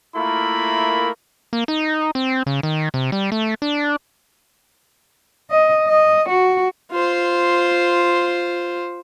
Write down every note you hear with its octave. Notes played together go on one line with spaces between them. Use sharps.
A3 A#3 E4 F4 A#4 B5
A#3
D#4
C4
C#3
D#3
C3
G3
A3
D4
D#5
D#5
F#4
F4 C5